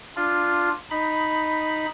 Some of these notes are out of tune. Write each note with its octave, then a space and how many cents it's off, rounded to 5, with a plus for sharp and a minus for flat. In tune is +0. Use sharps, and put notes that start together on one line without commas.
D4 +0 F4 +0
D#4 +0 B5 +0